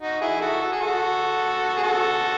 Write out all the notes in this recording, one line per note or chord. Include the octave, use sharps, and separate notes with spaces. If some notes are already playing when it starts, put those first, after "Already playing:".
D#4 F#4
E4 G#4
F#4 A4
A4
G#4
F#4 A4
G#4
F#4 A4